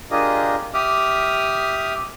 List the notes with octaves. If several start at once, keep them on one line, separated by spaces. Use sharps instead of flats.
D4 F4 G4 G#4 A#4 D#5
G4 E5 D6 D#6 F6